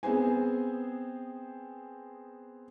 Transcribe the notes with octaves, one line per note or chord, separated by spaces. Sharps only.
B3 C4 G#4 C5 G#5